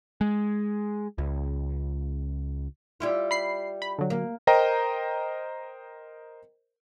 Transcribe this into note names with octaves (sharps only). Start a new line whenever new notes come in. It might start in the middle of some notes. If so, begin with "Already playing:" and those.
G#3
C#2
G3 E4 F4
B5 C7
B5
D3 F#3
A#3
A#4 C5 D#5 G5 A#5